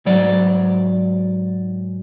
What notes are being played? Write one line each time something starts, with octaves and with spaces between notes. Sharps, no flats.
G#2 F#3 D5